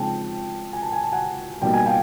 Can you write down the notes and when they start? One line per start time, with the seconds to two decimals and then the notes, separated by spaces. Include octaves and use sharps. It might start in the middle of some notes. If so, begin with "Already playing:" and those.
Already playing: C#3 F3 G#3 C4 D#4 G5 A5
0.73 G#5
0.83 A5
0.92 G#5
1.03 A5
1.12 F#5 G#5
1.62 B2 G3 A#3 D#4 G5
1.73 G#5
1.86 F5 G5